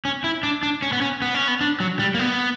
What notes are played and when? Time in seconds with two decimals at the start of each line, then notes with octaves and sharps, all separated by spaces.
0.05 C#4
0.24 E4
0.43 D4
0.63 D4
0.82 C#4
0.93 B3
1.01 C#4
1.22 B3
1.34 C#4
1.48 B3
1.61 D4
1.80 F#3
1.99 G3
2.15 A#3
2.19 B3